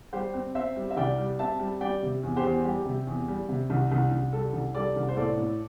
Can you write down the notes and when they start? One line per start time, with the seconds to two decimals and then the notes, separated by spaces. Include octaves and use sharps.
0.13 G3 G4 C5
0.34 C4
0.55 C4 C5 E5
0.76 G3
0.91 E5
0.97 C2 D5 G5
1.18 G3
1.39 C4 E5 A5
1.59 G3
1.81 G3 D5 G5
2.02 C3
2.23 E2
2.36 G4 C5
2.44 E2
2.64 G3 G4
2.86 C3
3.07 E2
3.28 G3
3.49 C3
3.70 C2
3.91 C2
4.11 C2
4.33 G3 A4
4.53 C2
4.75 G3 A4 D5
4.96 C2
5.09 C5
5.16 A2 A4 D5
5.37 A2